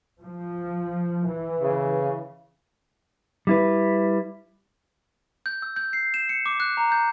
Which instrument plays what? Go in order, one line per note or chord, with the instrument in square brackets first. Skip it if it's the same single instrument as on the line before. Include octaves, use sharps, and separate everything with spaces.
[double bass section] F3
E3
[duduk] C#3
[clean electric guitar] G3 E4 B4
[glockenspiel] G6
E6
G6
C7
E7
C#7
D6
F#6
A#5
G6